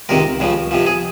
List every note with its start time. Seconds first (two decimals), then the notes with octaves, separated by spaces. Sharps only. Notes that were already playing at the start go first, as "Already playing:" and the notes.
0.09 C#2 C3 D#3 A#4
0.40 C#2 C#3 F3
0.71 F2 C3 F3
0.86 G#4